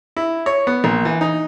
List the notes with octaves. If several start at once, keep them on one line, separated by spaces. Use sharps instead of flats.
E4
C#5
B3
A#1
E3
D#4